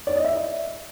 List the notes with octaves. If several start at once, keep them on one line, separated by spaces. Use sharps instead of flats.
D5
D#5
E5